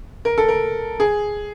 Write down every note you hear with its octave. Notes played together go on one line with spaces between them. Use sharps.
A#4
A4
A#4
G#4